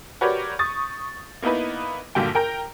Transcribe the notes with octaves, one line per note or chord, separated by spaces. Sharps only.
F#4 G4 A#4 B4 C#5 D5
C#6 D#6 A6
A#3 B3 D#4 E4 B4
A#1 G2 D3 A#3 F#4 G5
A#4 G5 A#5